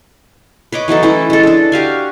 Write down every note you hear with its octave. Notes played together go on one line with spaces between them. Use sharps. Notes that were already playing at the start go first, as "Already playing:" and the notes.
B4 C#5 D#5 D6
E3 F#3 D#4 A4
E3 A3 C#4 E4
G#3 A4
D4 A4
F#4 G4 F5 G#5